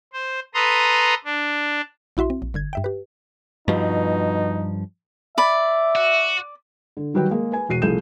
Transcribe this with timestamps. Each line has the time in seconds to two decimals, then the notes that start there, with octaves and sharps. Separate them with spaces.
0.13 C5
0.54 A4 B4 A#5 C6 D#6
1.25 D4
2.17 A#1 E4 F#4 E5 C6
2.30 C4
2.42 A#1
2.54 G1 D3 G#6
2.73 G2 E5 G5
2.84 G4 B4
3.68 G2 B2 F3 D#4
5.38 D5 E5 B5
5.96 F#4
6.97 D3
7.14 D#3 F#3 G3 F#4 B4 G5
7.31 G#3 A#3 G#4
7.52 B4 G#5
7.69 E1 F#4 C7 D#7
7.82 C2 F3 A3 G#4 G6 E7